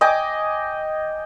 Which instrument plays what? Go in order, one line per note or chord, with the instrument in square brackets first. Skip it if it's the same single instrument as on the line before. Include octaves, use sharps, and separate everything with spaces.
[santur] D#5 G5 G#5 D6